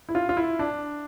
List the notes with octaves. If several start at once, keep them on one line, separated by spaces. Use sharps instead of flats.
E4
F4
F4
E4
D4